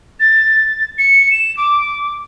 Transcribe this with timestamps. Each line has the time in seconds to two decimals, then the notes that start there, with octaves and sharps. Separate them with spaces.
0.20 A6
0.98 C#7
1.31 E7
1.57 D6